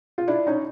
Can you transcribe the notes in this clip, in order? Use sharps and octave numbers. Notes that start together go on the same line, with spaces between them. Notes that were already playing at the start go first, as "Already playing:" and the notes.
F4
D4 E4
C#4 D#4